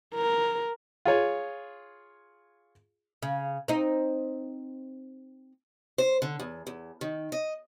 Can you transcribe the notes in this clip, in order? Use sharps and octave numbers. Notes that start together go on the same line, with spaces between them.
A#4
F4 G#4 C#5
C#3
C4 D#4
C5
D3
E2
E2
D#3
D#5